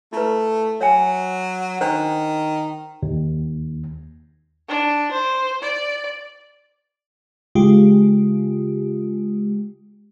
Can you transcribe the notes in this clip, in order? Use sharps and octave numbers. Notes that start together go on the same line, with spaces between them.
A3 E4 B4
F#3 C#5 G#5
D#3 D4 C5
D#2
D4
C5
D5
C#3 G#3 F4 G4